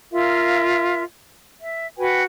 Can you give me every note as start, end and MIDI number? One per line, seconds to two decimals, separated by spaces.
0.12 1.03 65
0.12 1.03 70
0.12 1.03 76
0.12 1.03 77
1.60 1.87 76
1.97 2.22 66
1.97 2.22 71
1.97 2.22 79
1.97 2.22 80